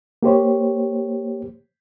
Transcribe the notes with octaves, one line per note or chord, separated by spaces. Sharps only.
A#3 G4 C5 C#5